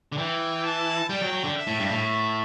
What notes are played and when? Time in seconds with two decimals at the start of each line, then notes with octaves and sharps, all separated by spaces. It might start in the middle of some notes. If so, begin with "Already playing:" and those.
0.12 D3
0.18 E3 G5
0.64 A5
1.09 G3 G5
1.22 F#3
1.33 F#3
1.44 D3
1.56 E5
1.67 A2
1.79 G2
1.91 A2